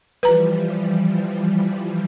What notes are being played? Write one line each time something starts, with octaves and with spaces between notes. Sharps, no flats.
E3 F3 G3 B4 A#5